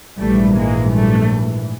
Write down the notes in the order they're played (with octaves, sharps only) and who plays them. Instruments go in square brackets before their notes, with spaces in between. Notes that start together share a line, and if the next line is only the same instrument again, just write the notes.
[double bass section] A#1 G#2 E3 [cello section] G3 A3
[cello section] G#3 A#3
G3 A3